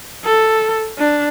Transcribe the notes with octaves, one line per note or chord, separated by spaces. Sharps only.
A4
D4